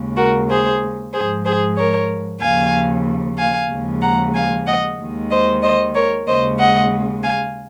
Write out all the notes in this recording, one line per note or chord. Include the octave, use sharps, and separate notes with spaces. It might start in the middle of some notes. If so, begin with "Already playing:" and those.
Already playing: D#2 C#3 G#3
F#4 A#4
G#4 C5
G#2 F3 G#3 G#4 C5
G#4 C5
A#4 C#5
D#2 C#3 F3 F5 G#5
F5 G#5
D#2 C#3 F3 G#3
F#5 A#5
F5 G#5
D#5 F#5
D#2 D#3 G#3
C5 D#5
C5 D#5
A#4 C#5
D#2 C#3 G#3 C5 D#5
D#5 F#5
F5 G#5